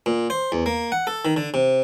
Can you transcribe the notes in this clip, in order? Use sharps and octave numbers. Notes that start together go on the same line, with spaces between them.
A#2
C5
E2
A#3
F#5
A4
D#3
D3
C3